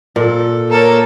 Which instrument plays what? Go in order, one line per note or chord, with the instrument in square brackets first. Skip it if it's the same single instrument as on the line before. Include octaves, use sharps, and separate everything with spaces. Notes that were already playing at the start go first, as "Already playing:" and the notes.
[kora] A#2 [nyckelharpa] A4
[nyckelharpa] A#3 [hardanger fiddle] A4 C#5 [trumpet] A#4